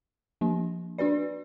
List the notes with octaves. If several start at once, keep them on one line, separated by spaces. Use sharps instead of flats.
F3 A#3 D4
D4 F#4 B4 D5